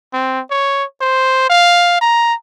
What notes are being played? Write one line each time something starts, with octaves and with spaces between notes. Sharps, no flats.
C4
C#5
C5
F5
A#5